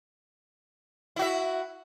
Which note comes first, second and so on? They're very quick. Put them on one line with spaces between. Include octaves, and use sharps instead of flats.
E4 F#4 E5